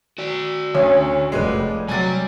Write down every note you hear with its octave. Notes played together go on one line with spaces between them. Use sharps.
F#4 D5
D2 C#4 C#5
F1 G3 G#3 B4
C3 F#3 G3 D5 G#5 A6